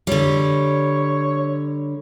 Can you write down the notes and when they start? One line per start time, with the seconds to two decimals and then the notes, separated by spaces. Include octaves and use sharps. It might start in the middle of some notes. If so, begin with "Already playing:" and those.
0.07 D3 G3 C#5